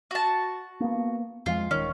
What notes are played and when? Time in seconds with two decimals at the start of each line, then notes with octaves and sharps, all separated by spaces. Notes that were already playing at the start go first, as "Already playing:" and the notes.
0.11 F#4 A5
0.80 A#3 B3
1.46 F2 F3 G#3 F4
1.71 D#1 D#3 C#4